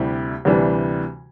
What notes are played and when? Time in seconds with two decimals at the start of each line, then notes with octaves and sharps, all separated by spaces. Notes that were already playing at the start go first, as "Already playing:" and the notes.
Already playing: D2 C3 G3 E4 G4
0.45 D2 C3 E3 G3 D4